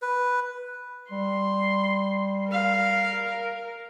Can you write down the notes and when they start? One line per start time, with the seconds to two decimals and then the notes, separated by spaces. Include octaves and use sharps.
0.02 B4
1.12 G3 C6
2.51 A#4 F5